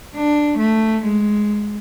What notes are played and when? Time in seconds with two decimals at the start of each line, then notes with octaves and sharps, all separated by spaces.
0.15 D4
0.58 A3
1.05 G#3